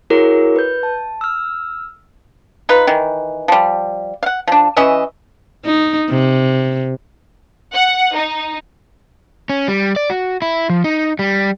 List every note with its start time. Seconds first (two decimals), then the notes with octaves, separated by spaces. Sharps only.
0.10 E4 F#4 G#4 A#4 C#5
0.56 B4 G6
0.83 A5
1.21 E6 F6
2.69 D#4 F4 B4
2.87 D#3 E3
3.48 F3 G3
4.23 F5 F#5
4.47 F3 D4
4.77 E3 C#4 D#5 E5
5.65 D#4
6.10 C3
7.73 F#5
8.15 D#4
9.49 C#4
9.68 G3
9.96 D5
10.10 F#4
10.42 E4
10.70 F3
10.84 D#4
11.19 G3